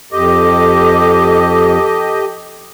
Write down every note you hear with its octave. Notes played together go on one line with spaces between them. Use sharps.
F2 G4 A4 D#5 D6